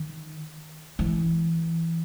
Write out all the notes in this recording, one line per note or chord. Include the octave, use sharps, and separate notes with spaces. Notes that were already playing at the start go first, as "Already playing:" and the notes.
Already playing: D#3
E3